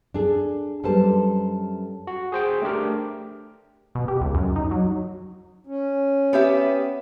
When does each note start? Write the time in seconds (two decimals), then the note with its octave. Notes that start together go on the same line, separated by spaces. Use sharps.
0.14 D4 G#4 A4
0.83 F#2 G3 A4 B4 C5 A5
2.07 F#4
2.32 G#4 C5 G5
2.62 A3 D4 G4 A#4
3.95 B2
4.08 G4
4.21 C#2
4.35 F#2
4.56 D#4
4.71 F#3
5.67 C#4
6.33 B3 G4 E5